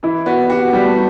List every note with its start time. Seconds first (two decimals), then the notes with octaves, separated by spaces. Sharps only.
0.03 E3 E4
0.26 B3 F#4
0.50 F#4 G4
0.73 G3 B3
0.85 A3